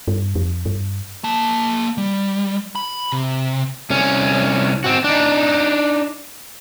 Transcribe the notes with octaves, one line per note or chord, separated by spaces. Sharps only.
G2
F2
G2
A#3 A5
G3
B5
C3
C2 C#4
C4 F#4
D4 D#4